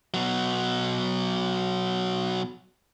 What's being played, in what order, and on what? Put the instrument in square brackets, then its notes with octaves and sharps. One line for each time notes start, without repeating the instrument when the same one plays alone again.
[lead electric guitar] B2 F#3